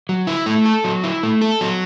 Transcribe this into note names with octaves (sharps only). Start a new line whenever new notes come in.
F#3
E4
A3
A4
F#3
E4
A3
A4
F#3